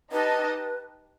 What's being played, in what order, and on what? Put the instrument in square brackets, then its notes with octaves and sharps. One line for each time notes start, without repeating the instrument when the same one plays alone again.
[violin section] D#4 G4 D#5 A5 [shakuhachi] B4